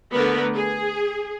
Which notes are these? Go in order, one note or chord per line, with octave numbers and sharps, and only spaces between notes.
D3 A3 B3 A#4 B4
G#4